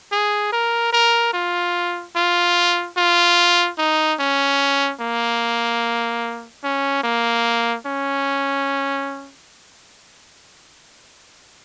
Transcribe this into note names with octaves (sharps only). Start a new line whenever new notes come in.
G#4
A#4
A#4
F4
F4
F4
D#4
C#4
A#3
C#4
A#3
C#4